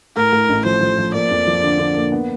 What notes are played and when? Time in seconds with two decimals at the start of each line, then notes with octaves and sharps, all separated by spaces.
0.16 A2 A#4
0.32 A2
0.49 A1
0.65 F3 C5
0.82 F3
0.98 F3
1.14 A#3 D5
1.31 F2
1.47 F3
1.63 D3
1.79 D3
1.96 A#3
2.12 B3